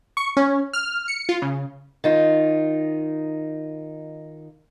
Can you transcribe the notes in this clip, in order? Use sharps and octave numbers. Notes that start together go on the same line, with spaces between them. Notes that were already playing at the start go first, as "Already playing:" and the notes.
C#6
C#4
F6
C#7
F4
C#3
D#3 D#4 F4